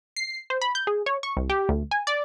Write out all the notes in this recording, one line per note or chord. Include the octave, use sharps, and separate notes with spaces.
C7
C5
B5
G6
G#4
C#5
C#6
C2
G4
D2
G#5
D5